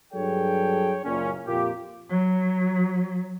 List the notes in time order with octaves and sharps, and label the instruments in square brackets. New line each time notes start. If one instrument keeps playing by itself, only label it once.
[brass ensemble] G2 F#3 G#4 A4 C#5 G5
F#1 A#2 C#4
F2 A#2 A#3 F4 G4
[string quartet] F#3